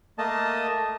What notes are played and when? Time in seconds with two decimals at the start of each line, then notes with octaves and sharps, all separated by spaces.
0.18 A3 A#3 D#5 A5